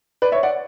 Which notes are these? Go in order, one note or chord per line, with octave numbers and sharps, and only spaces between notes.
B4 D5
C#5 E5
D5 F#5